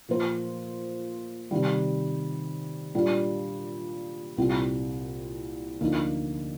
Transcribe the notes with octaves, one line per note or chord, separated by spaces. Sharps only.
A#2 F3 A#3 F4 C5
C3 D#3 G3
A#2 G3 D4
C2 A#2 G3 C4
D2 D3 F3 A#3 D#4